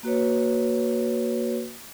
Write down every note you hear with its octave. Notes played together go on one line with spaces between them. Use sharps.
A#3 F#4 B4 C#5